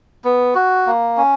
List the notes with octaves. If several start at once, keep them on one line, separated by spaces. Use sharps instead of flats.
B3
F#4
A#3
C#4